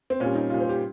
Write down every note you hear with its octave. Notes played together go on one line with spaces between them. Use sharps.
C4
A#2 G3 C#4
D#4
A#2 G3 F4
C5
G4